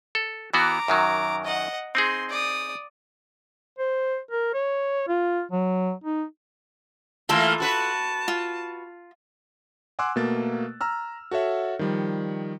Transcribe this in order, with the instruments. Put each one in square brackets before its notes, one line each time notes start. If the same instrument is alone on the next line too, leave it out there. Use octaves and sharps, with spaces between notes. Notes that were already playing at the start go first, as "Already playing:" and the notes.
[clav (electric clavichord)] A4
[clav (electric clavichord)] E3 B3 F#4 [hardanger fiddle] A#5 D6
[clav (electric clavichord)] F#2 D#3 F#3
[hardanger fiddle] D#5 F#5
[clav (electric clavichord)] C4 D#4 G#4 [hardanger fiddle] C6
[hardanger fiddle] D5 D#6
[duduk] C5
A#4
C#5
F4
F#3
D#4
[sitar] E3 A3 A#3 [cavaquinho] F4 A4 C6
[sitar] F#4 B4 [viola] A5
[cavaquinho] F4
[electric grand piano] F#5 G#5 C6 D6 E6 F#6
B2 A3 A#3 A6
A#5 E6 F6
F#4 A4 C#5 E5 F#5
D#3 F3 G3